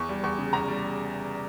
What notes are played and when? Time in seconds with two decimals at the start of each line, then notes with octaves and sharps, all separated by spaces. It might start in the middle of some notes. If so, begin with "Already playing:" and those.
Already playing: E2 C#6
0.09 G3
0.24 E2 C#6
0.39 C#3
0.53 E2 A#5
0.68 G3